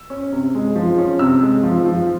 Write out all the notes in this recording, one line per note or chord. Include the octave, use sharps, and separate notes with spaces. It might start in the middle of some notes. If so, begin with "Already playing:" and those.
Already playing: E6
C#4
C3
G#3
F3
C#4
C3 E6
G#3
F3
F3